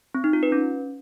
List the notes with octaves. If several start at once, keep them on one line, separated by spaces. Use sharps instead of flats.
C4
D#4
F4
B4
C#4